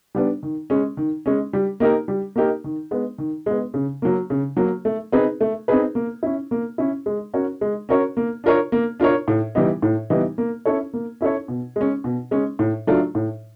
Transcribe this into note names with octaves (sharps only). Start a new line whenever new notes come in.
G3 B3 D4
D#3
G#3 C#4
D#3
G#3 C#4
G3
A#3 D#4 G4 A#4
G3
A#3 D#4 G4 A#4
D#3
G#3 B3
D#3
G#3 B3
C#3
F#3 A#3
C#3
F#3 A#3
A3
C4 D#4 G#4 B4
A3
C4 D#4 G#4 B4
A#3
C#4 E4
A#3
C#4 E4
G#3
C#4 F#4 A#4 C#5
G#3
C#4 F#4 A#4 C#5
A#3
D4 F4 A#4 C#5
A#3
D4 F4 A#4 C#5
A2
E3 G3 B3 D#4
A2
E3 G3 B3 D#4
A#3
C#4 E4 A4 C#5
A#3
C#4 E4 A4 C#5
B2
G#3 C#4
B2
G#3 C#4
A2
F#3 A3 D4 F4
A2